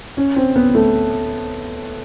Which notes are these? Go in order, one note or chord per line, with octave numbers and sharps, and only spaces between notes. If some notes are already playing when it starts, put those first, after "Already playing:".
C#4
C4
B3
A3